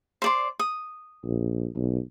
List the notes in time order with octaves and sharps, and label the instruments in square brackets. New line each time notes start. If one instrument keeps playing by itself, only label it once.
[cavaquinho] C5 D5 C6
D#6
[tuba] A#1
B1